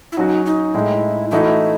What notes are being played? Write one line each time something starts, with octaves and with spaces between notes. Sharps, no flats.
E4
F#3 C#4 D#4 F#4
D#4
A2 G#3 D#4 E4
E3 A3 D#4 E4 F#4